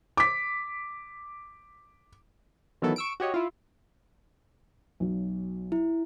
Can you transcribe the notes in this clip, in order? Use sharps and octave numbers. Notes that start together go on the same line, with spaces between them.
D6 B6
D#3 E3 F#3 B3 E4 A4
C#6 E6 D7
F#4 G4 C#5 D#5
E4 F4
B1 F#3
E4